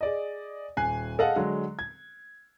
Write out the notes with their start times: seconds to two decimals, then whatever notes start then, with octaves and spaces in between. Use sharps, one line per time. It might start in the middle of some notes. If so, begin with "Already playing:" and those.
0.01 G#4 D5 D#5
0.77 D#1 G#5 F#6 C7
1.18 G#4 A4 D#5 F5 F#5
1.36 D3 F#3 G#3
1.79 G#6